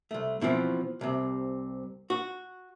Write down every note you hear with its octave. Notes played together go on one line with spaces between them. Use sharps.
C2 A3
B2 E3 F3 C4
C2 C3
F#4